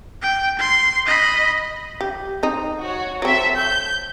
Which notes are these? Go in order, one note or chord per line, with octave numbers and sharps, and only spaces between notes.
G5
C6
D#5 B5
G4
C4 D#4
F#4 C#5
F#3 C4 A4 E5
G6